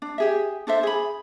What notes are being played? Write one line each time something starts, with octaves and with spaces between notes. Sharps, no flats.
D4
G4 G#4 E5
D4 A4 C5 E5
G#4 B5